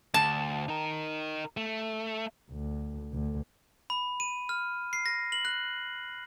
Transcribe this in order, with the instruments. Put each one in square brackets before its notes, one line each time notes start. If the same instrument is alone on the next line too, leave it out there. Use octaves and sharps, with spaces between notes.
[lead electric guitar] D2 [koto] A5
[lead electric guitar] D#4 A#4
A3
[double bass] D2
D2
[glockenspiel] B5
D#7
F6
C7
A#6
F#7
F#6